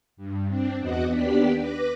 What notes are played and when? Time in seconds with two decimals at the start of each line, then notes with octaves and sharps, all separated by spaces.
0.17 G2
0.47 C4 D4
0.79 E2 B3 F#4 D#5 F#5 D6
1.10 D#2 B3 D4 G4 D5 B6
1.56 B4 D6 A#6